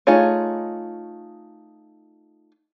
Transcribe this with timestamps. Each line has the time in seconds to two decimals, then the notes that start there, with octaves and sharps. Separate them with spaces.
0.07 A3 D#4 F4 G#4 C#5